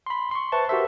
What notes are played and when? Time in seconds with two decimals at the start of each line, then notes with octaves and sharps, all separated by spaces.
0.06 B5 C6
0.31 C6 C#6
0.52 B4 C5 E5 A5 C#6
0.69 F#4 G4 A#4 C5 E5